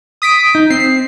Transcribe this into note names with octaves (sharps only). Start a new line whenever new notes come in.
D#6 B6 D7
D#4
C4 C7